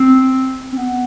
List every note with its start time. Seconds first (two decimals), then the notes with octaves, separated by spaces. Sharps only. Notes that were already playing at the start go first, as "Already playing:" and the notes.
Already playing: C4
0.73 C4
0.77 B3